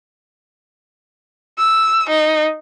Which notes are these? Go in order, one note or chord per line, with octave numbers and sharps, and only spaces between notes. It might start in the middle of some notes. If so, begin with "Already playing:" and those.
E6
D#4